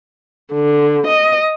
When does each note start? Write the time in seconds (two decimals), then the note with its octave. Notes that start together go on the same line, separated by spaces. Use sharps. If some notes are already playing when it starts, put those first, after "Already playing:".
0.54 D3
1.07 D#5